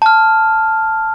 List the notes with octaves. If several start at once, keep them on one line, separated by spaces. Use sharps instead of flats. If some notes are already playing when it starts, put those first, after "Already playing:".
A5 F6